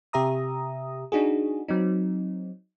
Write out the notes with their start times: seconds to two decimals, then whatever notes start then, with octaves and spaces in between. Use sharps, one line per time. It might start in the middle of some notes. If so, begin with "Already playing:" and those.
0.13 C3 G4 E5 A#5 D#6
1.12 D4 D#4 F#4 G#4
1.68 F#3 C4 D#4